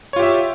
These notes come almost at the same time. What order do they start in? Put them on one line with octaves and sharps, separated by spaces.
C#5 F4 G4 E5